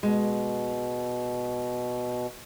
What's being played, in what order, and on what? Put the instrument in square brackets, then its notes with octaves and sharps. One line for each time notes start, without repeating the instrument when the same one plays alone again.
[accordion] B2 [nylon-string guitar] G#3